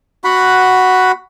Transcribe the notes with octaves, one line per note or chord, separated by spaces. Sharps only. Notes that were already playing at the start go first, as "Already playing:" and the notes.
F#4 F#5 B5